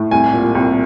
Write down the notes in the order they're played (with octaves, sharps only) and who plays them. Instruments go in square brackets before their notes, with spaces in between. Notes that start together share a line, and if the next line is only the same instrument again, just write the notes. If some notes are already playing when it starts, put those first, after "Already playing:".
Already playing: [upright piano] A2
C2 G#5
A#2
C2